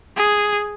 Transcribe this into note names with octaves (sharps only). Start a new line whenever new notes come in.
G#4